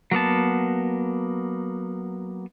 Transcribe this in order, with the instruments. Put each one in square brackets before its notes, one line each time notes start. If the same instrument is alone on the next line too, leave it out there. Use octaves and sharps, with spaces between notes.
[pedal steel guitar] F#3 A#3 B3 A5